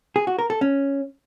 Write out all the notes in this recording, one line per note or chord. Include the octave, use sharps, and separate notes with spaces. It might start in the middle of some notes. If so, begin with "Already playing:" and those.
G#4
F#4
A#4
A4
C#4